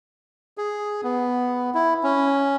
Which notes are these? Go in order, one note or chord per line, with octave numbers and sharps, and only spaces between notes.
G#4
B3
E4
C#4